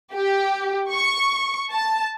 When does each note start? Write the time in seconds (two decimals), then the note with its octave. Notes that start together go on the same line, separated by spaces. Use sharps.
0.14 G4
0.91 C#6
1.71 A5